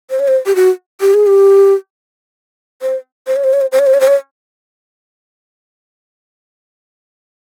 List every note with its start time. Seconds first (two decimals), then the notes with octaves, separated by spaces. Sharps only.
0.10 C5
0.20 C#5
0.28 C5
0.46 G4
0.55 F#4
1.01 G4
1.14 G#4
1.27 G4
2.82 C5
3.27 C5
3.36 C#5
3.44 C5
3.53 C#5
3.61 C5
3.72 C5
3.79 C#5
3.87 C5
3.94 C#5
4.01 C5
4.08 C#5